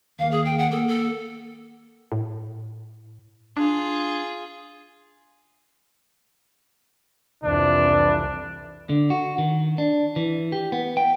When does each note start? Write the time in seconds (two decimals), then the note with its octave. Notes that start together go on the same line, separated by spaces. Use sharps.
0.19 D#2 A#3 F5
0.31 G#4
0.45 G5
0.58 F#5
0.71 A#3 A4
0.88 A4
2.12 A2
3.57 D4 F4 G#4
7.44 C2 F2 E3 D4
8.89 D3
9.10 F#4
9.38 D#3
9.78 D4
10.16 E3
10.52 G4
10.72 B3
10.97 G5